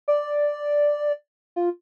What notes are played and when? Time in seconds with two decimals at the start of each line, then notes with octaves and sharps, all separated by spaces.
0.08 D5
1.56 F4